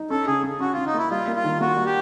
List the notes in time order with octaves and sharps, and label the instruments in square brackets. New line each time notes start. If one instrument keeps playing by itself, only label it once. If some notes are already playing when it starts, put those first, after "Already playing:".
Already playing: [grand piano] D#4
[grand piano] C#4 [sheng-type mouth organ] A4
[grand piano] C#3 [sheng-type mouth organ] G#4
[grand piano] C#4
[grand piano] C#4 [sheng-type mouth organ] F#4
[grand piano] C#4 [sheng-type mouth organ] F4
[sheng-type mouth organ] D#4
[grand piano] A#3 [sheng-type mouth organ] E4
[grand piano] G3 [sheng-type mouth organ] F4
[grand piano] A#3
[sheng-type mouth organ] F4
[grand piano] D#3
[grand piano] A#3 [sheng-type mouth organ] F#4
[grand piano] G3
[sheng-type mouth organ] G4